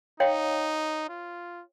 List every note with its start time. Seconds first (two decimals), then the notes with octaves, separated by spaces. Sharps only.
0.20 D#4 C#5 F5 G5
1.10 F4